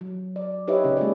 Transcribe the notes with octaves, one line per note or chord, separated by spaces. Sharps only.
F#3
D5
D#4 G4 B4 C#5 D#5 E5
C#3 C#4
G#3 A#3 F4 B4 D5